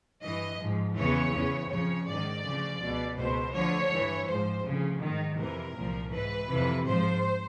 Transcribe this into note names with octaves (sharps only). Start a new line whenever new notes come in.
G2 E3 D#5
G#2 F3
E2 C#3 E3 C#5
E2 C#3 E3
F2 C#3 F3 C#5
G#2 D#3 D5
D2 C#3 F3
C#2 B2
C#2 B2 C5
D2 D3 F3 C#5
G2 E3
G#2 F3 C5
D2 C#3 F3
G#2 D#3
F2 C3 E3 A#4
C2 A#2 F3
G#2 E3 B4
F2 C3 E3
G#2 F3 C5